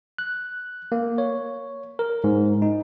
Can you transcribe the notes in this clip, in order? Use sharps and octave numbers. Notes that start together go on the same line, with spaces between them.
F#6
A#3
C#5
A#4
G#2
D#4